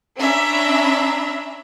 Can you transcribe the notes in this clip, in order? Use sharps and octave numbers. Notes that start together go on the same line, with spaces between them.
C#4 D4 E5 A#5 B5